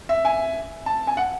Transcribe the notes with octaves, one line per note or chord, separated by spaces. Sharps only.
E5
G#5
A5
G#5
F#5